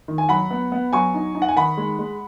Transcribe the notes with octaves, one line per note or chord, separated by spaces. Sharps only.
D#3
G#5
F#3 F#5 B5
B3
B3
F#3 G#5 C#6
D#4
D#4
F#5
G#5
D#3 F#5 B5
G#3
G#3